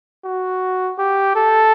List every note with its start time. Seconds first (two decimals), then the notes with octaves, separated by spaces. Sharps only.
0.25 F#4
0.98 G4
1.36 A4